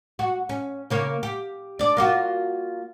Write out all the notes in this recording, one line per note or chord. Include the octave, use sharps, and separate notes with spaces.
F#4
C#4
C#3 A#3 C#5
G4
D4 D5
A#3 F4 F#4